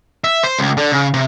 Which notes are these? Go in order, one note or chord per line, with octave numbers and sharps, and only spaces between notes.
E5
C5
C#2
D3
C#3
C3